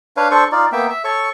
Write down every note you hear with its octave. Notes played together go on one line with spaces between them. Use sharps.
D4 B4 C#5 F5
D4 A4 C5 C#6
D#4 F4 D5
A#3 B3 E5 G5
E5
A4 C#5 C#6